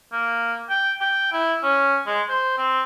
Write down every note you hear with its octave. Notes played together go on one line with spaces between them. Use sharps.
A#3
G5
G5
E4
C#4
G#3
C5
C4